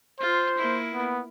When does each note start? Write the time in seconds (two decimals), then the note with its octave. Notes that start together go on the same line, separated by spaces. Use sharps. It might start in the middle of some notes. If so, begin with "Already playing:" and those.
0.20 F4 C5
0.58 A#3 E4
0.94 B3